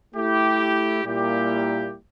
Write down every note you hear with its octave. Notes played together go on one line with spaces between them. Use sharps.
A3 E4 G4
A#2 G3 A#3 E4 G4